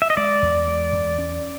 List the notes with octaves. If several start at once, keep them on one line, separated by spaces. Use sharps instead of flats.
E5
D#5
G#3 D5
E2
G#3
E2
C#4